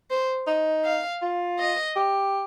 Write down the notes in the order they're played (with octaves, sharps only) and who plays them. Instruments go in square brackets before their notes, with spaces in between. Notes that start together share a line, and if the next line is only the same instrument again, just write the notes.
[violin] C5
[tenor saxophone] D#4
[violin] F5
[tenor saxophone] F4
[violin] D#5
[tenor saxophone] G4